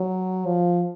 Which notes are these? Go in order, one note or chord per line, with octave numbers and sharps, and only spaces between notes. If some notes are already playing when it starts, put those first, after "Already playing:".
Already playing: F#3
F3